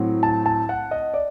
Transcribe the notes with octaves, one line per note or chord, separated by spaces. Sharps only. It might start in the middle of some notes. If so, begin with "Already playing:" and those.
Already playing: A2 F#3 C4
A5
A5
F#5
D#5
D5